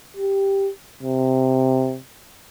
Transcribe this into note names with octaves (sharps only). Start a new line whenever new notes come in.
G4
C3